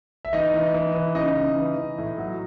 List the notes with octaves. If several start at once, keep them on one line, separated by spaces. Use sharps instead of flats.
E5
E3 D#4 D#5
E3
E3
E3
C#3 D#4 D#5
C#3
E3
E3
A2
F#3